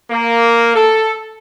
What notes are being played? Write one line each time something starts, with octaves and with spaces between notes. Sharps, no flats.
A#3
A4